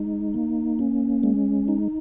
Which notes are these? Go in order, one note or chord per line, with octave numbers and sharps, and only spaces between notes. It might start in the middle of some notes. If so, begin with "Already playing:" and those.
Already playing: G#3 D#4
A#3
C#4
G#3
D#4